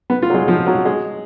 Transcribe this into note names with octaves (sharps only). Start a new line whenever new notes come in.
B3
F4
F#3
G#3
F3
F#3
G#3